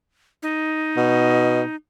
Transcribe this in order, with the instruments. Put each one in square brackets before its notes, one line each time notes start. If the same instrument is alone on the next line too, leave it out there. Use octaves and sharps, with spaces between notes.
[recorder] D#4
[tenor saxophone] B2